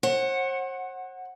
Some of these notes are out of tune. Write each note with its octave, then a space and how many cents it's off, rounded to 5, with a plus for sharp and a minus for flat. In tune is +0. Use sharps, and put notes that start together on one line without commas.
C5 +45 F#5 +0